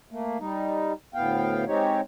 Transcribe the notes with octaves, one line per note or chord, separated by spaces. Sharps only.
A3 A#3
G3 D#4
D2 A2 B3 F5 G5
G#3 C4 D#4 G4 C#5